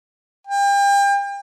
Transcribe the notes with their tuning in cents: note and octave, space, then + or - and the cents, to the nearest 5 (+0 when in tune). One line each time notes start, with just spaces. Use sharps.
G5 +35